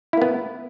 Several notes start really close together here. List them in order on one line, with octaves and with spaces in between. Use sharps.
E4 A#3 B3